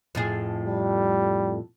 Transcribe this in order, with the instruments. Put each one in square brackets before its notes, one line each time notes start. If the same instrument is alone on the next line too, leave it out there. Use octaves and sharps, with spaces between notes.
[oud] F2 A2 G#4
[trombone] G3